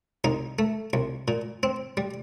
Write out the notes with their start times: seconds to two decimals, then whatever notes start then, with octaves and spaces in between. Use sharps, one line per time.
0.24 C2 D#4
0.59 A3
0.93 C2
1.28 A#2
1.63 C4
1.97 G3